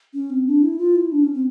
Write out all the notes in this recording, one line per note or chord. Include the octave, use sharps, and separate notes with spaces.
C#4
C4
D4
E4
F4
E4
D4
C#4
C4